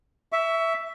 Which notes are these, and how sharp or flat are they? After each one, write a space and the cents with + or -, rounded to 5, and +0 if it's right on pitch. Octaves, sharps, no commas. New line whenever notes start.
E5 +0 C#6 +30